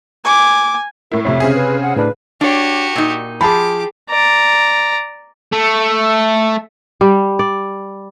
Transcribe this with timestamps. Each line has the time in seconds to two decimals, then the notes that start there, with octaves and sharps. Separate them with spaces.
0.25 G#5 D6
1.12 A2 E4 A#4
1.25 F2 A2 C3 C#5 E5
1.40 C#3 C4 G#4
1.55 B4
1.82 F#5
1.96 A2 D4 B4
2.41 D4 F#4 G4 C#5
2.96 A#2 D#4
3.41 F3 G4 G#4 A5 B5 D6
4.10 D5 A#5
5.53 A3
7.01 G3
7.39 D5